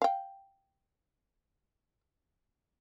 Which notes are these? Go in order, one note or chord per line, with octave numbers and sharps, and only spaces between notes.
F5 G5